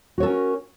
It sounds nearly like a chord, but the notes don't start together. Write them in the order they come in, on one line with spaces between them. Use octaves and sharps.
F#4 C#5 A4 C#4 A#4